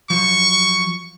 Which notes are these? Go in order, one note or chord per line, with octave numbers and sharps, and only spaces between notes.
F3 F#3 C#6